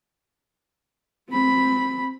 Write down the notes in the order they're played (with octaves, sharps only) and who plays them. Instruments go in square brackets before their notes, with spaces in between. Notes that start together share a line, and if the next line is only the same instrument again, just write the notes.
[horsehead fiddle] C4 B5